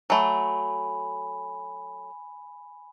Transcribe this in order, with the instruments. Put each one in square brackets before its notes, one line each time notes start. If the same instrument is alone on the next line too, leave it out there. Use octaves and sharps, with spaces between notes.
[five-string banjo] F#3 A3 [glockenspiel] G#5 B5